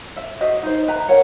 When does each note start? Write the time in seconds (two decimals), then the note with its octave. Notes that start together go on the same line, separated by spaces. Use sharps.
0.16 E5
0.41 F#4 C5 D#5 E5
0.63 D#4 C5
0.88 B4 E5 G5 A#5
1.09 A#4 C#5 F#5